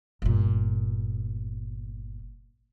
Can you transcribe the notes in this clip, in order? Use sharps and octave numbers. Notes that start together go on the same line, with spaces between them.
G1 A#2